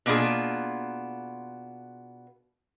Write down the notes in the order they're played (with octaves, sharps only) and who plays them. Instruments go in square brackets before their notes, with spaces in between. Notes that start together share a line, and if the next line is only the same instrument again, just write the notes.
[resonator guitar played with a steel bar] B2 A#3 B3 D4 F4 G#4